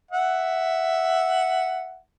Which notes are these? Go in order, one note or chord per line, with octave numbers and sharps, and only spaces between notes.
E5 F#5